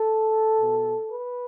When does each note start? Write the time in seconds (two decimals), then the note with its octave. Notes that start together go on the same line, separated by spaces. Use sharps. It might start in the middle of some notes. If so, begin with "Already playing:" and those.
Already playing: A4
0.58 B2 B3
1.10 B4